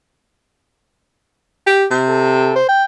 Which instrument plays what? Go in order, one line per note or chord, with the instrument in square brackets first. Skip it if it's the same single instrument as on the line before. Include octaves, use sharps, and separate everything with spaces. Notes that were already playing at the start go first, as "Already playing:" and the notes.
[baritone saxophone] G4
C3
[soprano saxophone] A4
C5
G5